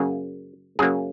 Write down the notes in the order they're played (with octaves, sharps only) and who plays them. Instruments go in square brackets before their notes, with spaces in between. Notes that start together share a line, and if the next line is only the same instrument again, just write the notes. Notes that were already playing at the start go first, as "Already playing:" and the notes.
Already playing: [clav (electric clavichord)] F#2 C#3 F#3 A#3 G#4
F#2 C#3 F#3 A#3 G#4